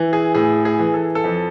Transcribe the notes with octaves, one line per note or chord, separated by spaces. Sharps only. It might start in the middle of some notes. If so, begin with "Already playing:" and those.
Already playing: E3
G#4
A2 G#4
G#4
E3
A4
A4
F2